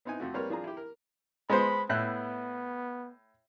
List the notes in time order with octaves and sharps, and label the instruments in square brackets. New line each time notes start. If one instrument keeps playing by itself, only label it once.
[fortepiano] B3 C4 D#4 E4 G#5
F2 A3 F#4
G3 A#3 C4 A#4 B4 C#5
F3 D4 G#4 A#5
E4 G4
A#4
[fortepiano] G#3 B3 C5 [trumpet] B5
[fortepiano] A2 E4 F#6 [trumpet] B3